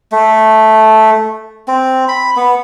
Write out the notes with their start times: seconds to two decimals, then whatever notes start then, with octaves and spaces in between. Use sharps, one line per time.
0.12 A3
1.68 C4
2.08 B5
2.36 B3